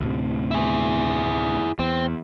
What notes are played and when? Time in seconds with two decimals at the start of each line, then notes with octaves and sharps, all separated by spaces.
0.01 D2 A2 C3
0.51 E4 G#4
1.79 E2 C4